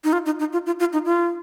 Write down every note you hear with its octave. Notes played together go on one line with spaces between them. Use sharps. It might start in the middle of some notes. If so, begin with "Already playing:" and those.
D#4
F4
D#4
D#4
F4
F4
F4
D#4
F4